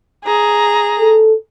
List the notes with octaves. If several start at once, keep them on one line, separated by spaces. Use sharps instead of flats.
G#4 A#5
A4